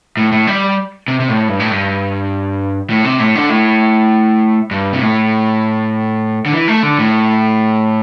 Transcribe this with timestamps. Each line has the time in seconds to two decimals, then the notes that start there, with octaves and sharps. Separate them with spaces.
0.17 A2
0.32 A2
0.47 G3
1.08 C3
1.20 C3
1.29 A2
1.48 G2
1.60 A2
1.71 G2
2.90 A2
3.04 C3
3.20 A2
3.35 D3
3.50 A2
4.71 G2
4.93 C3
5.02 A2
6.46 D3
6.52 E3
6.68 A3
6.83 D3
6.99 A2